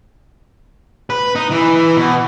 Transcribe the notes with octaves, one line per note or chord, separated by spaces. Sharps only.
B4
D#4
E3
B2